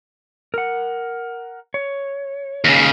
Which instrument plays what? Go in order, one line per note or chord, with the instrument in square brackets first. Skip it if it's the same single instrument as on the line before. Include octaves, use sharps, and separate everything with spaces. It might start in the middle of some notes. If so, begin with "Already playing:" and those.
[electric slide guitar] A#4 F#5
C#5
[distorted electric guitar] D#2 C#3